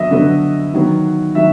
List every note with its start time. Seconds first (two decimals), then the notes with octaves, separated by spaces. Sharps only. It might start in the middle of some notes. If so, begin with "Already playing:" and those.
Already playing: D3 F#3 B3 D#5 E5
0.11 D3 F#3 B3
0.74 D#3 F#3 B3
1.35 D#3 F#3 E5